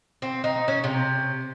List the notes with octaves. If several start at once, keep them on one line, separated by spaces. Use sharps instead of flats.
C4
D#4
C#4
C3